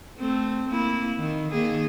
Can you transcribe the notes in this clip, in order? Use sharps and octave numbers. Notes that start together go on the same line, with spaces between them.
A3 C4
A#3 E4
D#3
D#3 A#3 G#4